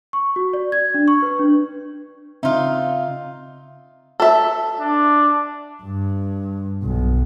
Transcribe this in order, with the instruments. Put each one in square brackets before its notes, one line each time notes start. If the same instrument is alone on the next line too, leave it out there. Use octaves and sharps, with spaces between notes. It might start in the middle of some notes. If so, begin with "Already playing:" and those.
[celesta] C#6
F#4
D5
G#6
D4
C#6
B4
D4
[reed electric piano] C#3 C4 E5 [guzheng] D#4 F4
[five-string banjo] A4 E5
[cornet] D4
[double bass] G2
B1